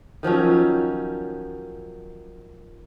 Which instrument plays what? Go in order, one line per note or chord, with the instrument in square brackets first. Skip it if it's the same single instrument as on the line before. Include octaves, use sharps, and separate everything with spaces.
[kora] D#3 F3 F#3 C#4